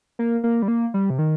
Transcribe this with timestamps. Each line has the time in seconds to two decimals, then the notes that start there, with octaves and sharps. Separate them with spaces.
0.19 A#3
0.44 A#3
0.62 G3
0.68 A#3
0.94 G3
1.10 C3
1.18 D#3